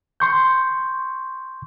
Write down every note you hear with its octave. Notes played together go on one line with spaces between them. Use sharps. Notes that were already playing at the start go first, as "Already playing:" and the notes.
C6 C#6 G6